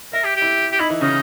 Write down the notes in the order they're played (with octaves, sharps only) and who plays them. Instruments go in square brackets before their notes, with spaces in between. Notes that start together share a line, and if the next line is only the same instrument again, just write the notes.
[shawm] A#4 [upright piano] E5
[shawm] G4
G4
[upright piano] E4 E5
[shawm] G4
[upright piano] D#4 D#5 [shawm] E4
[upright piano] E3 E4
[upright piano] C#3 C#4 [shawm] D#4